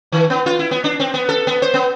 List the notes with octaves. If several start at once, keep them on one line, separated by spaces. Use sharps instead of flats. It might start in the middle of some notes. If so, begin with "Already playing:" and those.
D#3
B3
F4
E4
B3
D4
C4
B3
A4
B3
C5
B3